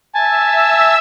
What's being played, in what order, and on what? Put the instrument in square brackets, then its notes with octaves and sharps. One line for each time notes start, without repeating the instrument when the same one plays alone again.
[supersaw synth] E5 E6 [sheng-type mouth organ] G#5 A5